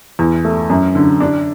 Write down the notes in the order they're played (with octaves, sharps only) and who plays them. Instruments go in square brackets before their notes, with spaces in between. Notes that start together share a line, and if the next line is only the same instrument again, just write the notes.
[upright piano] E2
A3
F#2
D3
D4